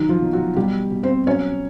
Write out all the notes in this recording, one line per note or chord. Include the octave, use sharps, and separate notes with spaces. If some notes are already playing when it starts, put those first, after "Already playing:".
Already playing: D#3 F#3 D#4
F3 F4
B2
F#3 F#4
B2 G3 G4
B2
C4 C5
F#3 C#4 C#5